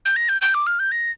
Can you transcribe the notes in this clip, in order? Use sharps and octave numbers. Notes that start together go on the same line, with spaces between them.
G6
A#6
G6
G6
D6
F6
G6
A#6